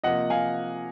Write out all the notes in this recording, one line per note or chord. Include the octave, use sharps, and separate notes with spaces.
C3 F3 A#3 D#5 F#5
F5 G#5